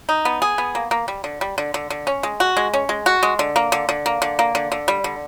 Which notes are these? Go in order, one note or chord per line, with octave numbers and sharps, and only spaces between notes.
D#4
B3
G#4
B3
A#3
A#3
G3
D3
G3
D3
D3
D3
C#4
G#3
F#4
G#3
C#4
G#3
F#4
G#3
D3
A#3
D3
D3
A#3
D3
A#3
D3
D3
G3
D3